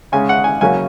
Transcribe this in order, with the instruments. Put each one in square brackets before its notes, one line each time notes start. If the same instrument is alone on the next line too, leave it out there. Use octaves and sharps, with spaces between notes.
[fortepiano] C#3 G#3 C#4 G#5
F#5
G#5
C#3 F#3 A#3 C#4 G#5